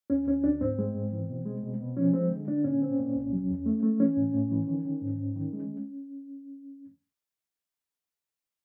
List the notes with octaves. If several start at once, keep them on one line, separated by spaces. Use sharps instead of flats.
D2 C#4
D2 C#4
D2 D4
G#2 C4
G#3
G#2
E3
B2
G#3
B2
B2
F3 C#4
G#3 C4
D3
D3 D4
A#2 C#4
C4
A#2
C2
F#3
E2
A3
A3
E3 C#4
A2
A2
E3
D#3
D#3
G#2
G#2
D#3
G#3